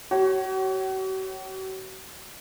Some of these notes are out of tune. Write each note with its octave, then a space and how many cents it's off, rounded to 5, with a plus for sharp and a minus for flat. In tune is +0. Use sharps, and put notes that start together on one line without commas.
F#4 +45 C#5 -10